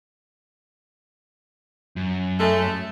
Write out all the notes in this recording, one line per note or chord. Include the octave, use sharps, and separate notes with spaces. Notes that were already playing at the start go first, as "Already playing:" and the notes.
F#2
G#3 A3